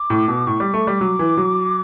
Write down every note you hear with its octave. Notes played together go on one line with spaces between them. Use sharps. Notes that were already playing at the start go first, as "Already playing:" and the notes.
Already playing: D6
A2
B2
A2 C#6
G3 D6
A3 C#6
G3 D6
F#3
E3
F#3